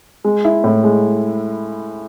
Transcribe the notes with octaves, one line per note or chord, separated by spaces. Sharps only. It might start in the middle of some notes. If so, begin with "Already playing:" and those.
G#3
E4
A2
G#3